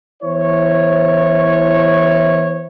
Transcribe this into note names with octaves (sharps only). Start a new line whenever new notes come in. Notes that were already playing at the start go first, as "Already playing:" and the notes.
E3 B3 E4 C5 C#5